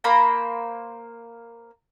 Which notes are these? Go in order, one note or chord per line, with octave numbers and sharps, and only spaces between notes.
A#3 C5 A#5 B5